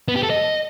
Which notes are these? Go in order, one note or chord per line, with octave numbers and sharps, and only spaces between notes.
B3
G4
A4
D#5